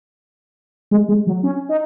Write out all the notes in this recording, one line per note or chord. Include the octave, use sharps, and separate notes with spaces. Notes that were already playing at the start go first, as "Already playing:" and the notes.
G#3
G#3
F#3
C#4
D#4